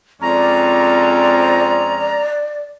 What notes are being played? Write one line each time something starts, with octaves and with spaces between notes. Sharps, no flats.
F2 G#3 C4 C#4 D5 A#5